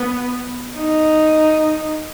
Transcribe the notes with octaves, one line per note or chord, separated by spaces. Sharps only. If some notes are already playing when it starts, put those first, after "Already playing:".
Already playing: B3
D#4